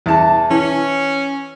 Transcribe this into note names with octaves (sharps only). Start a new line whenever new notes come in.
E2 A5
E3 C#4